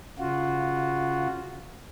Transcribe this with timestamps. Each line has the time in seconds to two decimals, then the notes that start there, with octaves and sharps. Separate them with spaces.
0.19 C#3 F4 F#4